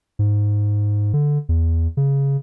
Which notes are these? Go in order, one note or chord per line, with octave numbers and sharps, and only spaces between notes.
G#2
D3
E2
C#3